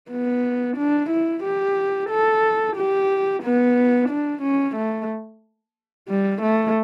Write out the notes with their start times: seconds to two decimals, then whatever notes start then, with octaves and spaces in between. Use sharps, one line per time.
0.11 B3
0.77 D4
1.11 E4
1.44 G4
2.10 A4
2.77 G4
3.44 B3
4.10 D4
4.43 C#4
4.76 A3
6.09 G3
6.42 A3